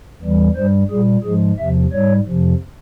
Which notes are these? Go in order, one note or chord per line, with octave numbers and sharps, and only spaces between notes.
E2 E3 G3
G2 G3 C5
A#2 G3 G#4
G#2 F3 G#3 G#4
E2 C3 F3 E5
G#2 G3 C#5
F2 C3 F3